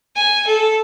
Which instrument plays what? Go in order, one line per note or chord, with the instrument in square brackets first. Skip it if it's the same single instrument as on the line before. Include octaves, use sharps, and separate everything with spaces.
[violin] G#5
A4